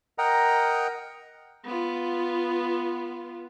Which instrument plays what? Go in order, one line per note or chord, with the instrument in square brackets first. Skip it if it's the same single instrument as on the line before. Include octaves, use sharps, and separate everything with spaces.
[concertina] A#4 D#5 F#5 G5 A#5
[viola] B3 F4